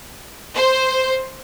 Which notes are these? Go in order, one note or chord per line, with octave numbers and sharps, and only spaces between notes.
C5